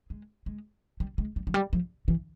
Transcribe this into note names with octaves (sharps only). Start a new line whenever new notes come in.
G#3
G#3
G3
G#3
G3
F3
G3
F3
E3